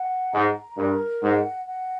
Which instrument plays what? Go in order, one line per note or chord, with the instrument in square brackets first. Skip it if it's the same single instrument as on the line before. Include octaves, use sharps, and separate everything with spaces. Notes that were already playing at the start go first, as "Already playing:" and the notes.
Already playing: [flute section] F#5
[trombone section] G#2 [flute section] A#5
[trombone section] G2 [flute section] A#4
[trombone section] G#2 [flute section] F#5
[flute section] F#5